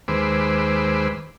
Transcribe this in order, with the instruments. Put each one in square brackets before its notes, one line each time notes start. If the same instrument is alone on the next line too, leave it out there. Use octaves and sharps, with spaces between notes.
[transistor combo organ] D#2 G#3 B4 C5 D6 E6